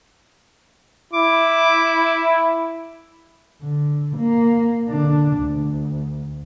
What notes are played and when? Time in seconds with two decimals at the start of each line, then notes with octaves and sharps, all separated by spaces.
1.13 E4 D6
3.62 D3
4.17 A#3
4.88 D3 D4
5.38 D2